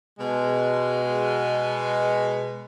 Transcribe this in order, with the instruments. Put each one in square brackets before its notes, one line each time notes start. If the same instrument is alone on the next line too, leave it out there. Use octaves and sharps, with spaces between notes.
[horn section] B2 G#3